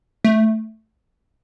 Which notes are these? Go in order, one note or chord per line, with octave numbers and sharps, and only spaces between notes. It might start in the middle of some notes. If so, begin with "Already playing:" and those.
A3